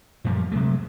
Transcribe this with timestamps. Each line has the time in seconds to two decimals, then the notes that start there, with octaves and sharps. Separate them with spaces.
0.25 F#2 A#2 F3 G3
0.52 C3 F#3 G#3 A3